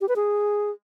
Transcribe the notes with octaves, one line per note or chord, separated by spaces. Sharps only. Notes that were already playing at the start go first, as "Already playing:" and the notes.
G4
B4
G#4